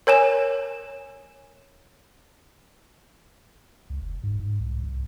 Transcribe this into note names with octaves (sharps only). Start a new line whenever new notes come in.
A#4 C#5 G#5 E7
C#2
F1
G#2
G#2
C2
C2